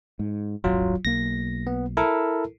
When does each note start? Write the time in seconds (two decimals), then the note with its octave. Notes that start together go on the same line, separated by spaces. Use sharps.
0.19 G#2
0.64 D#1 G#1 F#2 F#3 F4
1.05 B1 A#3 A#6
1.67 B3
1.97 E4 A4 A#4